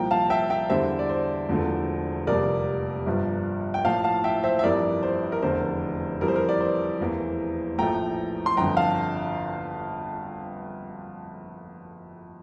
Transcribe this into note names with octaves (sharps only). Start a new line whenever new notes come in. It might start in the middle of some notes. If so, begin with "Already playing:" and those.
Already playing: C2 A#2 F3 G5 A#5
F5 A5
E5 G5
E5 G5
E2 D3 G3 A#3 C5 E5
D5
C5
E1 E2 D3 F3 A3
F1 F2 C3 G3 A#3 A#4 D5
G1 G2 F3
G5
A1 A2 F3 A#3 F5 A5
F5 A5
E5 G5
C5 E5
E5
G1 F2 E3 G3 A#4 D5
C5
A#4
F1 E2 D3 C5
F2 E3 G3 A#4
C5
A#4
D5
C5
F1 E2 E3 A#3
A#1 A2 F3 A3 G5 A#5
C6
G1 F2 D3 G5 A#5
F5 A5